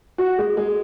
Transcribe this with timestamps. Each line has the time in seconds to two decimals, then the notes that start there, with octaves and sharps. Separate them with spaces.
0.18 F#4
0.38 G#3
0.57 G#3